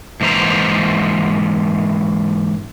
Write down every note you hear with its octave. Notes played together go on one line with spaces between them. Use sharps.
G#2 E3 A#3 C5 A#5